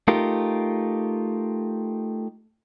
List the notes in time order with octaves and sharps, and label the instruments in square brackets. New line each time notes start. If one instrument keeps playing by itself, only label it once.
[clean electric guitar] A3 D#4 F4 G4 A#4